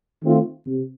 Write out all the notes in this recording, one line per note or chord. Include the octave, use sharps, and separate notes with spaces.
D#3 A3 C4 F4
C3